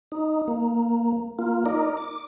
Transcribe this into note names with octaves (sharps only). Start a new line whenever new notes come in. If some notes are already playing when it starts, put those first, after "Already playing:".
D#4
A#3
A#3 F4
D#4 A#4 D5
D6